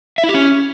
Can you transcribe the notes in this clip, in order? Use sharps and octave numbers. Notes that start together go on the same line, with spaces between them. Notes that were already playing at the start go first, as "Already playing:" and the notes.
E5
E4
G4
C#4